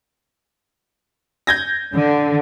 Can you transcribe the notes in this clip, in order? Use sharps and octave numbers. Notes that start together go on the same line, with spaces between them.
G6 G#6 A#6
D3